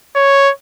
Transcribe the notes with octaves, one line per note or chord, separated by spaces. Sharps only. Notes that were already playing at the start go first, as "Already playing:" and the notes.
C#5